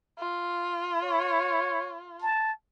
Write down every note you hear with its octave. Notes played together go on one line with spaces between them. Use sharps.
F4
C#5
A5